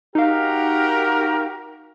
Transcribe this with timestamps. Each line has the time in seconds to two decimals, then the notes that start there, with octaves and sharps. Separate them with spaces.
0.15 D#4 F#4 G4 A#4 F5